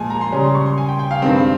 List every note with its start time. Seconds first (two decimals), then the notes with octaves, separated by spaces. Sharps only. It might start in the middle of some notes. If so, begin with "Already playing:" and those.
Already playing: A#2 F3 G#3 G#5
0.10 A#5
0.21 C6
0.32 C#3 G3 C#4 A#5
0.44 C6
0.55 C#6
0.66 C6
0.78 G#5
0.88 G5
0.99 G5
1.11 F5
1.22 G2 D#3 G#3 C4